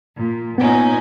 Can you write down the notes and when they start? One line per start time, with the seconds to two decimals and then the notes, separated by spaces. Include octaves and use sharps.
0.16 A#2
0.58 A#2 B3 C#4 D#4